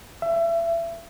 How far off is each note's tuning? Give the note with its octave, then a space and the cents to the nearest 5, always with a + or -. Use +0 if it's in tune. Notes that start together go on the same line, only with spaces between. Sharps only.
E5 +30